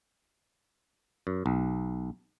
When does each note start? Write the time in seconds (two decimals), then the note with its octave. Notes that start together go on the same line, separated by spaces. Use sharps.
1.27 F#2
1.46 B1